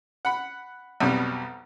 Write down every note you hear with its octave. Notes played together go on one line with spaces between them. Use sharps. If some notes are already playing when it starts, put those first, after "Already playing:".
F#5 B5
B1 F2 B2 G3